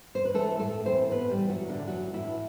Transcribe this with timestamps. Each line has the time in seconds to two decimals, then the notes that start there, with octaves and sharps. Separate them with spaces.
0.15 C5
0.25 B4
0.34 E3 A3 A4
0.59 A2 A3 A4
0.85 E3 C4 C5
1.11 A2 B3 B4
1.30 G3 G4
1.37 E3
1.50 F#3 F#4
1.62 A2
1.69 D3 D4
1.87 E3 F#3 F#4
2.13 A2 E3 E4